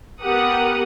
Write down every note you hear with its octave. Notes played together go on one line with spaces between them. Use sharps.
B3 G4 A#4 F#5 D#6